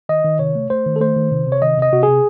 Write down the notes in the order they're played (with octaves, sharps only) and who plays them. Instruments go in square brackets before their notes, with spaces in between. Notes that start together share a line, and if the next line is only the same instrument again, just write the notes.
[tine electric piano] D#3 D#5
D#3
C3 C#5
A3
A3 C5
D#3
A4
A3 C5
D#3
C3
C3
C#5
D#3 D#5
C3 D#5
C3 F#4
C3 G#4